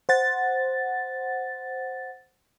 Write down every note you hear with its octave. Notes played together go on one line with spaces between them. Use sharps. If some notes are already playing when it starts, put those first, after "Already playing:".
C5 F#5 A6